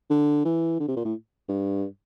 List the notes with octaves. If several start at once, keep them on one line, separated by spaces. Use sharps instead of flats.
D3
E3
D3
C3
A#2
A2
G2